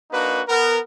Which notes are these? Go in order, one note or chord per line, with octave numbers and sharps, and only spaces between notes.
A#3 D4 D#4 F#4 B4
B3 A#4